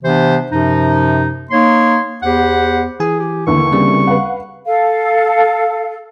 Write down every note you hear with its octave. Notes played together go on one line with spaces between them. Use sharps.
C3 E3 B3 D4 C5
F#2 C3 F3 D#4
A#3 D#4 C#5 C6
E2 B3 G4 C5 F#5
E3 G#4 G#5
G4
D#2 D3 E3 C#6
C#3 G3 C4
B4 F5 F#5
A4 F5